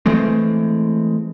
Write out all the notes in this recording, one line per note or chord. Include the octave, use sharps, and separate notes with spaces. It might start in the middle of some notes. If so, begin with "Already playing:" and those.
E3 G#3 A3 C4